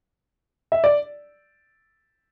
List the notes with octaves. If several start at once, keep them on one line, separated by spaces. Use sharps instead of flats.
E5
D5